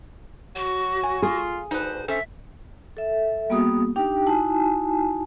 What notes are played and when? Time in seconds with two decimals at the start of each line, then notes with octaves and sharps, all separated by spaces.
0.55 F#3 F#4
1.03 G#5
1.22 F4 G#4
1.71 D2 D#4 B4 C5
2.08 C#4 A4 C5 E5
2.97 A4 E5
3.50 G3 A#3 B3 F#4 G#4 D#6
3.96 D4 D#4 G4 G5
4.26 D#4 E4 F#4 G#5 A5